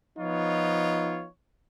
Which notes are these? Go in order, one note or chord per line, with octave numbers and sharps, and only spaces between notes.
F3 B3 D#4 F4 C#5